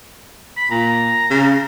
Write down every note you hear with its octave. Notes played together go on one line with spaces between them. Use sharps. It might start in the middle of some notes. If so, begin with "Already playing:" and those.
B5
A#2 A#5
C#3